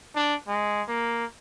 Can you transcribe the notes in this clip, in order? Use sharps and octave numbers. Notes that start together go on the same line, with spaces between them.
D4
G#3
A#3